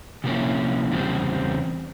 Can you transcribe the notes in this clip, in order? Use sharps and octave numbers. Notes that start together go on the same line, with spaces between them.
C3 F3 A#3 C#4 E4
E2 C#3 G3 C4